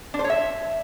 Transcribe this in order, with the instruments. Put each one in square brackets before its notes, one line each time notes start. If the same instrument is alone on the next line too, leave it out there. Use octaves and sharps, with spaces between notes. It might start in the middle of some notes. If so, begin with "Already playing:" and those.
[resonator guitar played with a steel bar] D4
C5
C#5
E5